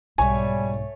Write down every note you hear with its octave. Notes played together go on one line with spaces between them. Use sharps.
B1 G#2 G3 A3 C#5 G#5